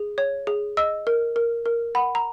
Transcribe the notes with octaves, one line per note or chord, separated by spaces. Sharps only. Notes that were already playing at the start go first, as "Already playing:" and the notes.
Already playing: G#4
C#5
G#4
D#5 E6
A#4
A#4
A#4
F#5 B5
A#5